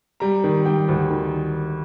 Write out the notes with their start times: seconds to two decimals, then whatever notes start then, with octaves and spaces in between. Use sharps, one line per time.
0.20 G3 A#5
0.44 D#3
0.65 G3 G5
0.88 D2
1.10 D#3